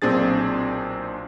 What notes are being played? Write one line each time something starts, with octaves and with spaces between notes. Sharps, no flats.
B1 A#2 C4 D4 G#4 A6